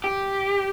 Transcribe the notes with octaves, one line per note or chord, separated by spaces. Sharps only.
G4